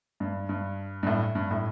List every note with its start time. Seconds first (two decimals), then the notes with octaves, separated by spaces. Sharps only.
0.20 G2
0.49 G2
1.03 G2
1.07 A2
1.35 G2
1.51 A2